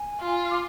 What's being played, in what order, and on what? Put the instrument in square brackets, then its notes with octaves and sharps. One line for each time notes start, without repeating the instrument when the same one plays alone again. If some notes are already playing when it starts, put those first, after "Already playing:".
Already playing: [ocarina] G#5
[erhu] F4
[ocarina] D6